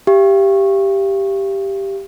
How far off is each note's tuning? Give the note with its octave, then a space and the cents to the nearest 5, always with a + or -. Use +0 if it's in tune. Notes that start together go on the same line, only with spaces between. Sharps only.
G4 +0 F5 -40